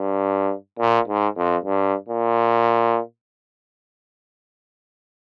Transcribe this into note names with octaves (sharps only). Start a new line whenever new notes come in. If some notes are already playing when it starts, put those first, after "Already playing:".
Already playing: G2
A#2
G#2
F2
G2
A#2